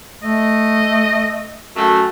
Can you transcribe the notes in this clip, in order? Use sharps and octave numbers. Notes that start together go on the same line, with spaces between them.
A3 D#5
F#2 A3